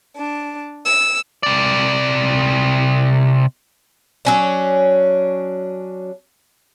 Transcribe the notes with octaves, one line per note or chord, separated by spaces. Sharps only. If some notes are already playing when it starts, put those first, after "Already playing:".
D4
E6
C3 D5
F#3 C#4 D4